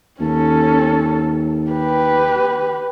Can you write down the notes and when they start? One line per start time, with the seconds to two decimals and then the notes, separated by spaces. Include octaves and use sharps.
0.21 D#2 C#4 A4
1.71 G4 B4